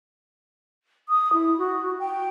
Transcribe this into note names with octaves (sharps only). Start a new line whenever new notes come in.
D#6
E4
F#4
G5